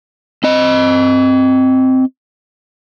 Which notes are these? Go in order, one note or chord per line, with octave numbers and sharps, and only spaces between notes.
C4 D#5